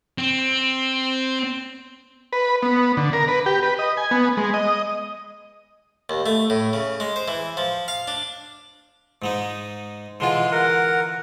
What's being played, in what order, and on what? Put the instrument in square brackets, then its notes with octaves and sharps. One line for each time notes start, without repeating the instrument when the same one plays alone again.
[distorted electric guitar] C4
[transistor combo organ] B4
B3
D3
A#4
B4
G4
B4
D#5
G#5
B3
G#3
D#5
[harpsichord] D#2
A3
A2
C#3
G#3
C5
E3
F3
F5
D4
G#2 G#3 D#4
[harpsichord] D3 E3 F4 [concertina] G#3 C6
[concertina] A#4 F#5